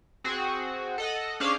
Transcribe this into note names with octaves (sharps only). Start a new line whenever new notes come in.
C4 F#4 G#4
A4 D#5 F#5
C#4 D4 G#4 C5 F5